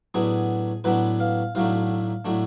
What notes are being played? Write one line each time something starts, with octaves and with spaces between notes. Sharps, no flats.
A2 F#3 B3 D4 G#4
A2 F#3 B3 D4 B4
F5
B1 A2 F#3 A3 D4 F5
A2 F#3 A3 D4